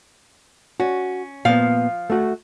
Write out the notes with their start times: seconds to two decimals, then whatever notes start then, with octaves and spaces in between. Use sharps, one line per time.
0.80 C#4 F#4
1.45 A#2 F3 B3 F5
2.10 A3 F#4